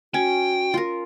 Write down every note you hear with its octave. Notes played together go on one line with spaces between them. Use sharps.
C#4 F#4 G5
F4 A#4